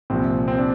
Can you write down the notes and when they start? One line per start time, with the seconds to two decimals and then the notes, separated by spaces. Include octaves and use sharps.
0.10 C2 A#2 F3 C4
0.48 C4
0.59 D4